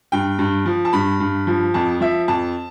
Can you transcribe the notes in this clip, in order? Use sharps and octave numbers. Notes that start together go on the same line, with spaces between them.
G2 G5
G2
F3
A5
G2 B5
G2
F3
F2 A5
F3 E5
F2 A5